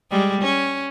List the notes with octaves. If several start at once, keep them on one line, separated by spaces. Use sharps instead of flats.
G3 G#3
C#4